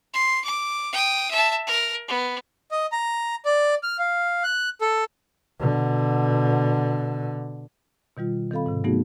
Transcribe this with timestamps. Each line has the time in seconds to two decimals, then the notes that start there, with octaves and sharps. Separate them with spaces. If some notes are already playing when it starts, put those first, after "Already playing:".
0.14 C6
0.45 D6
0.92 G5 D#6
1.31 E5 A5
1.67 A#4
2.08 B3
2.71 D#5
2.92 A#5
3.45 D5
3.83 F6
3.99 F5
4.44 F#6
4.81 A4
5.60 B2 D3
8.17 B2 D#3 G3 F4
8.51 D#3 C4 A4 F5 B5
8.66 G#2 C3
8.84 F#3 A3 B3 D#4 F#4 G#4